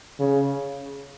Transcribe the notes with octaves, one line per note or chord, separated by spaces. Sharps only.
C#3